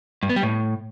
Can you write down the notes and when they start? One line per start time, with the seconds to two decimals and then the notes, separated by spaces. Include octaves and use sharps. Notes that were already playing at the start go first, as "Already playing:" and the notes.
0.23 G2
0.29 B3
0.36 G3
0.43 A2